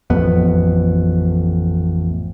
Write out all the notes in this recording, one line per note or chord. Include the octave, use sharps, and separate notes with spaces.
A1 F2 B3